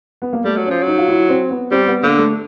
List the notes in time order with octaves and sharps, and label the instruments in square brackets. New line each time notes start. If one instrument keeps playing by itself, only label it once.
[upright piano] B3
A#3
[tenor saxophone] G3 [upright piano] A3
[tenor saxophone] F#3
[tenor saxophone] F3 [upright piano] C#4
[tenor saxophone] F#3 [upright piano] D#4
[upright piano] F4
E4
C4
B3
[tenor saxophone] G3 [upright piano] C4
[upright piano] B3
[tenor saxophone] D3 [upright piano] A#3
[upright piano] A3